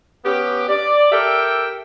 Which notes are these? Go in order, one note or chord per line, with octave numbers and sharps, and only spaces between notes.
B3 C#4 G4
D5
G4 A4 A#4 E5 G5